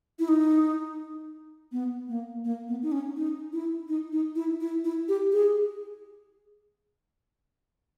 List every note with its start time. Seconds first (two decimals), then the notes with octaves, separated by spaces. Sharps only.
0.19 E4
0.28 D#4
1.72 B3
2.08 A#3
2.44 A#3
2.68 B3
2.83 D#4
2.92 C#4
3.17 D#4
3.53 E4
3.88 D#4
4.12 D#4
4.36 E4
4.61 E4
4.84 E4
5.08 G4
5.33 G#4